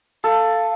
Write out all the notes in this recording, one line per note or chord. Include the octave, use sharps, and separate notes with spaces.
A4 F5